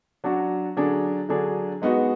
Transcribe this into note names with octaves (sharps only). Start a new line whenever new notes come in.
F#3 D4 F#4
D3 F#3 D4 G#4
D3 F#3 D4 G#4
G#3 B3 D#4 F#4